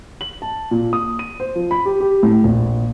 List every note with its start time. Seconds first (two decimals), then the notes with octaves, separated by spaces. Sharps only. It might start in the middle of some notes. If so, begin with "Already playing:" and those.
0.21 F#7
0.42 A5
0.71 A#2
0.93 D#6
1.19 D#7
1.40 C5
1.55 F3
1.71 B5
1.86 G4
2.00 G4
2.23 A2
2.44 A#1